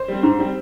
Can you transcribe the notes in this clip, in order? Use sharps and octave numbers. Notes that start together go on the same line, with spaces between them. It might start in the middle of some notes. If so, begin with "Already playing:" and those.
Already playing: C5
G3 C4
G#2
G3 C4